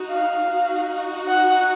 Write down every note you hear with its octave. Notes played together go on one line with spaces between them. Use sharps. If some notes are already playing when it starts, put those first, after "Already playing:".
Already playing: D#4 F#4
F5
D#4 F#4
F#5